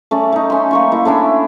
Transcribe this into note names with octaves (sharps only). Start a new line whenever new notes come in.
A3 C#4 D5
A3 D#4
C#4 C6
A#3 C6 C#6
A#3 E4
A3 C#4 D4 E4